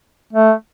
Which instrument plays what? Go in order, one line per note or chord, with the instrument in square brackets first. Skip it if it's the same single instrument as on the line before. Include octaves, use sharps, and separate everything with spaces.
[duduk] A3